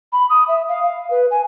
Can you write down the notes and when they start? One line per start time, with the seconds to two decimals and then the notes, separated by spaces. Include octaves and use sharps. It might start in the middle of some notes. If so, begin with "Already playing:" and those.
0.12 B5
0.30 D#6
0.48 E5
0.69 F5
0.83 F5
1.11 B4
1.31 G#5